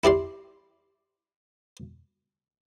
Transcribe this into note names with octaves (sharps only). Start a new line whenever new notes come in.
E4 G4 D5 C6